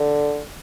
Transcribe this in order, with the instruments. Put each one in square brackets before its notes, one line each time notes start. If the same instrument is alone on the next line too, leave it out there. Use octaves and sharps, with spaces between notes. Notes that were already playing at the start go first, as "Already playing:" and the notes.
Already playing: [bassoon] D3